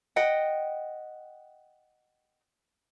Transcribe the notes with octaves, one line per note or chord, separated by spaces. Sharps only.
D#5 F#5 G5